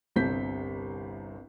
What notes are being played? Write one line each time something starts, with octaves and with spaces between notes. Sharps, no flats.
G1 C2 C3 C4 G6 B6